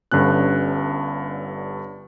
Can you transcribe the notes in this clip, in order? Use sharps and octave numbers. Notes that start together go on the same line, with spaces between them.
G1 G2 D3 C#4 F#6